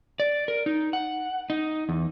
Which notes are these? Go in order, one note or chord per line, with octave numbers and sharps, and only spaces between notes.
D5
A#4
D#4
F#5
D#4
E2